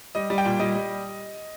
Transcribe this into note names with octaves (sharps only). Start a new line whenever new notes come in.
G3 D#5
G3
G5
A#2
G3 D#5
G3